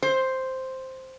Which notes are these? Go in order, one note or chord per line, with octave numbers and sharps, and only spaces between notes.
C5